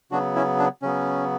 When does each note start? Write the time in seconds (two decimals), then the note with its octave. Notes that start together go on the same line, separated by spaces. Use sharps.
0.11 C#3 F#3 B3 D4 F#4
0.35 C#4 E4
0.59 D4
0.82 C#3 F#3 B3 C#4